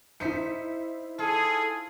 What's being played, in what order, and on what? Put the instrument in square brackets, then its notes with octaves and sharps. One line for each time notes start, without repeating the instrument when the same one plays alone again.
[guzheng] D#4 C5 [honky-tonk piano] E4 B6 C#7
[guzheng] F4 [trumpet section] G#4 [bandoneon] A4